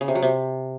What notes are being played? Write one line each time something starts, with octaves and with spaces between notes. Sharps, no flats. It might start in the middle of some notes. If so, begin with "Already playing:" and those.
C#3
C3
F#3
C3